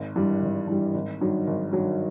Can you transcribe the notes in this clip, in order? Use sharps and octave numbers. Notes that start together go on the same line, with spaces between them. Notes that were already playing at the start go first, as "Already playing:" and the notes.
Already playing: G#1
G2 E3 G3
G#1
G2 E3 G3
G#1
G2 D#3 F#3
G#1
G2 D#3 F#3